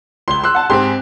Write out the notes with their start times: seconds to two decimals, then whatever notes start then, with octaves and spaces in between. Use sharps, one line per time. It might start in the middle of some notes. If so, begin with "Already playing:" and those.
0.28 C#2 C6 G7
0.44 C6 E6 F#6
0.55 F#5 A5
0.70 G#2 C4 G4 G#4 C6